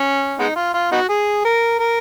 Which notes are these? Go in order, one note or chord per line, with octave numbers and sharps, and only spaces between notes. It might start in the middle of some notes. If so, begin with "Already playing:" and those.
Already playing: C#4
G#3 B3 D#4
F4
F4
B3 D#4 F#4
G#4
A#4
A#4